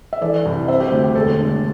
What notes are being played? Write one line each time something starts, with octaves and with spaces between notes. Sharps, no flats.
E5
E3 A4 D5
C2
C4 C5 E5
G4 C5
D2
G4
E1 A4
D3